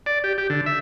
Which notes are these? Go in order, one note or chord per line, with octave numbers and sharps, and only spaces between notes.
D5
G4
G4
D3
E5